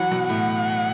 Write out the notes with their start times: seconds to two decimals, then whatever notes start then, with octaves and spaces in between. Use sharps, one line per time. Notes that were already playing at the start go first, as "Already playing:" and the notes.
Already playing: E3 F#3 F#5
0.11 B2
0.29 A2 F#5